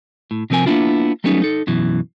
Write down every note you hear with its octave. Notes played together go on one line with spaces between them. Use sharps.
A2
C3 F3 C4 A#4 G#5
A#3 B3 C#4 D4 E4 F4
F#3 G3 A3 B3 C#4 D#4
D#4 A4
F#2 B2 E3